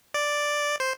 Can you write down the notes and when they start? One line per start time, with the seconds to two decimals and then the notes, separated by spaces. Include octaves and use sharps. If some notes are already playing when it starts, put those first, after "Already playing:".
0.14 D5
0.80 C5